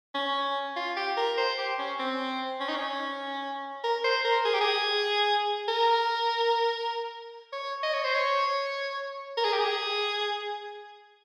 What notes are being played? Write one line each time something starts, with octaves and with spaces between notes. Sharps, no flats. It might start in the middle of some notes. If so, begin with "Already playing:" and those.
C#4
F4
G4
A#4
C5
G4
C#4
C4
C#4
D#4
C#4
A#4
C5
A#4
G#4
G4
G#4
A#4
C#5
D#5
C#5
C5
C#5
A#4
G#4
G4
G#4